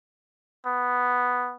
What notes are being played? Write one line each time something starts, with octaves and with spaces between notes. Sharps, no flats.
B3